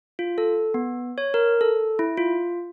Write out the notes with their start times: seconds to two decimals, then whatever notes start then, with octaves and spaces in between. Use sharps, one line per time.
0.19 F4
0.38 A4
0.74 B3
1.18 C#5
1.34 A#4
1.61 A4
1.99 E4
2.17 F4